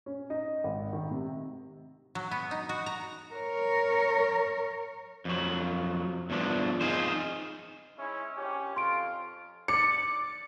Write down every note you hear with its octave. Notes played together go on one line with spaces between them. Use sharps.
C#4
D#4
G#1
D#3
C3
F#3
B3
D#4
F#4
A#5
A#4 C#5
F2 F#3
E2 G2 F3 D4
C4 D#4 F4 G#4 C5
G#3 C#4 E4
A#1 C#4 G4
F2 F4 C6 D7
D5 C#7